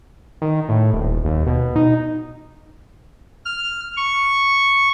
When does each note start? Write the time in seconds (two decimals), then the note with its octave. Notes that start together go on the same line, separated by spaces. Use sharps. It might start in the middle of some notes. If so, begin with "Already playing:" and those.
0.42 D#3
0.69 A2
0.93 D#1
1.25 D#2
1.47 B2
1.76 D#4
3.45 F6
3.97 C#6